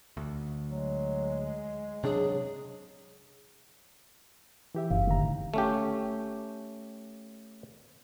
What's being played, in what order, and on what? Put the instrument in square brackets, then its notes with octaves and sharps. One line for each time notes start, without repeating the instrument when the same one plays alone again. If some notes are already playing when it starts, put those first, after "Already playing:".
[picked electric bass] D2
[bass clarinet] F#3 [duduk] G#3
[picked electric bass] C3 D4 [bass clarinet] F#3 [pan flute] G#4
[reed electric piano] E3 G4 E5
[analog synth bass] F#1 [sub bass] F#2 [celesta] F5
[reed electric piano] A2 D#3 A#5 [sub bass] D3
[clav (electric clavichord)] A3 C#4 G4